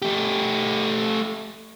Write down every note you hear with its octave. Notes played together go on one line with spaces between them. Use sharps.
A3 G4